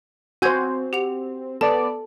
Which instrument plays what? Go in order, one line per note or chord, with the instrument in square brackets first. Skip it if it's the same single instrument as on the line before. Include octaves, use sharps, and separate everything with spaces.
[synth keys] C4 [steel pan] F#4 C5 [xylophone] G#5 G6 G#6
[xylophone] G4 F#5 F7
[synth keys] B3 D5 [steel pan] A4 [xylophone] A5